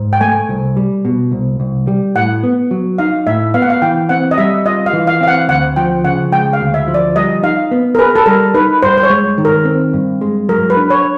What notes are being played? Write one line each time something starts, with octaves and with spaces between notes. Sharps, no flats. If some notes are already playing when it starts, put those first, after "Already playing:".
Already playing: G#2
G5
A3 G#5
C2
G3
B2
C2
C2
G3
A2 F#5
B3
F#3
D#4 F5
A2 E5
B3 F5
F#5
F5
E3 G5
C4 F#5
D#5
G3 E5
F4 D#5
F5
E3
F5
C4 F5
F#5
D2 F#5
F3 G5
C#3 F#5
G#3 G5
F5
D2
E5
F3
D5
G3 D#5
D#4 F5
B3
A#4
G#4 B4
A4
G3 A#4
D#4 B4
G2 C5
C5
C#5
G#3
D#3
A#4
C4
G2
G#3
F#3 A#4
B4
D4
C#5